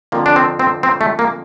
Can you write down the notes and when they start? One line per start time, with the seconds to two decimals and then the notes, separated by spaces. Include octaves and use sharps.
0.12 F2 D3 F3 A#3
0.26 D4
0.36 C4
0.59 C4
0.83 C4
1.01 A3
1.19 A#3